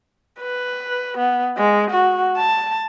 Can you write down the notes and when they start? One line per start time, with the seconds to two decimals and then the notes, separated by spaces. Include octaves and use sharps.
0.41 B4
1.18 B3
1.57 G#3
1.90 F#4
2.37 A5